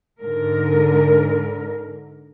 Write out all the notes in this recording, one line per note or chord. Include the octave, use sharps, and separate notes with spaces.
G#2 D3 A#4